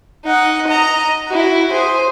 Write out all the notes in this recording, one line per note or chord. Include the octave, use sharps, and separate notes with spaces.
D#4 F#5
D#5 A#5
E4 F#4
G#4 C5